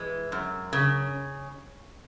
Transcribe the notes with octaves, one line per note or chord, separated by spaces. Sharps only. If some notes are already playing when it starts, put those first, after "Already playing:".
Already playing: E3 G#3
F#2
C#3